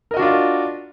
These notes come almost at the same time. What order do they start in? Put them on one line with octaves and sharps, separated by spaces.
A#4 D#5 F#4 D4 F4